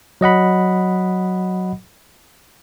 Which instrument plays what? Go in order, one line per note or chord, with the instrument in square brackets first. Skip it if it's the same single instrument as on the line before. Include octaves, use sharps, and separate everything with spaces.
[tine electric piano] F#3 D#5 F#5 B5